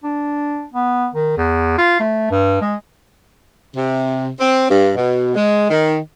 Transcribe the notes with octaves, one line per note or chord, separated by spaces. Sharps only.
D4
B3
D#3
E2
F4
A3
G2
G#3
C3
C4
G2
B2
G#3
D#3